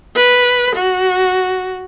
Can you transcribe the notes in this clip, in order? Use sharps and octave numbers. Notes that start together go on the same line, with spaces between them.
B4
F#4